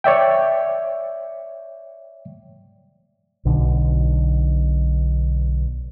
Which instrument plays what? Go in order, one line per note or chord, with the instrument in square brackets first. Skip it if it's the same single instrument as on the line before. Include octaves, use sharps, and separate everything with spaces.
[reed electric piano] C#5 D5 E5 G5
[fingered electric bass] B1 B2 D3